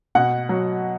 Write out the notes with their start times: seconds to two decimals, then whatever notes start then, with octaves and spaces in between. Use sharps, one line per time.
0.15 B2 F#5
0.49 F#3